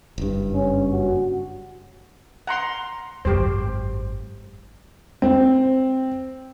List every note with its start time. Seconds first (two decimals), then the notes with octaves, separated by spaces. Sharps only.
0.18 F#1 G2
0.54 C#4
0.92 F#4
2.47 F#5 A#5 C6
3.25 G#1 F#2 G4 C5
5.22 C4